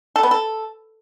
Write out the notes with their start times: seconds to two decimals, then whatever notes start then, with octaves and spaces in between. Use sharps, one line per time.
0.16 A4
0.23 B3
0.31 A4